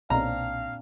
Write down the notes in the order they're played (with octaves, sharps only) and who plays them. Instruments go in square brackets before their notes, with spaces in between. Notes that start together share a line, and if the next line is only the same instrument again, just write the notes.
[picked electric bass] B1 [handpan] A#2 C4 D4 [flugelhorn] F5 [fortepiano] A#5